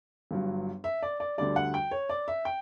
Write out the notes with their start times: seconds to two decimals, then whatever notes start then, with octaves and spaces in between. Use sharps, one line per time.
0.31 G1 G2 F#3
0.84 E5
1.02 D5
1.20 D5
1.38 D2 D3 G3 D5
1.56 F#5
1.74 G5
1.91 C#5
2.09 D5
2.28 E5
2.45 G5